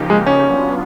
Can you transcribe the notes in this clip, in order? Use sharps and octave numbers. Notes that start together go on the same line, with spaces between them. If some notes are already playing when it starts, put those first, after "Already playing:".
Already playing: C#3 F3 A#3 D#4 G4
G#3
C#4
F#3 B3 D4 F4